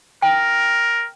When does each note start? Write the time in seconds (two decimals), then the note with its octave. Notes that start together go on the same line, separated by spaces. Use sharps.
0.22 A#4 G5